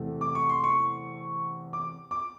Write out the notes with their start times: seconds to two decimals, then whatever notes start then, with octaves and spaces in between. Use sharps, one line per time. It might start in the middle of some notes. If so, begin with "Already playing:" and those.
Already playing: E2 C3 E3 A3
0.21 D6
0.35 C#6
0.49 C6
0.64 C#6
1.73 D6
2.11 D6